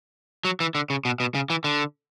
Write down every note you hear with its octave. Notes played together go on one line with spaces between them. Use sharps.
F#3
E3
D3
C#3
B2
B2
C#3
E3
D3